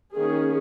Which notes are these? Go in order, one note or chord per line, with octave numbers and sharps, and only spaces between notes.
D#3 A#3 C#4 G#4